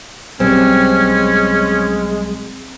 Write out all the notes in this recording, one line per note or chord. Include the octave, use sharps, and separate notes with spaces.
B1 G3 G#3 C4 C#4